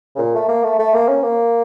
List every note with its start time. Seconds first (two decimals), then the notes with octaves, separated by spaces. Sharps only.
0.15 C#3
0.18 A#2
0.34 A3
0.48 A#3
0.63 A3
0.79 A3
0.94 A#3
1.08 C#4
1.23 A#3